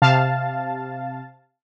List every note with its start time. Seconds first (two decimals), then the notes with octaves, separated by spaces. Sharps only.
0.02 C3 F5 A5 A6